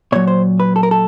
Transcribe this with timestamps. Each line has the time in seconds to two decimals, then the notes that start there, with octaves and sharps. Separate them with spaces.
0.12 A#2 F#3 C#5
0.28 C5
0.60 B4
0.76 A4
0.83 A#4
0.91 A4